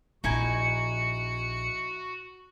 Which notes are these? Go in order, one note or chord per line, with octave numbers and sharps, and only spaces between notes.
A#1 D#4 E4 F#4 G#5 C#7